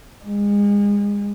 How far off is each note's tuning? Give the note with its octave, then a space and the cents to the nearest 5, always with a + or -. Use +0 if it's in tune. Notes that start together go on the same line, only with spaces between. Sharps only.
G#3 -30